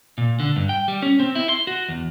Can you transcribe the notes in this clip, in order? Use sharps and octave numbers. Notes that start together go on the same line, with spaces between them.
A#2
D3
G2
G5
G3
C#4
C4
E4
C6
F#4
E2